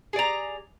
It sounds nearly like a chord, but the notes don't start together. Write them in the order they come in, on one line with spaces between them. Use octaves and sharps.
G#4 D5 A#5